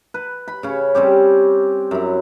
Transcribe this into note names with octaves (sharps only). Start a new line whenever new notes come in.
B4
B5
C#3 C#4
G3 C4 C#4 G4
F#2 E4